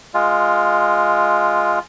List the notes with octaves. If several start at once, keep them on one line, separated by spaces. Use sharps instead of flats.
G#3 F4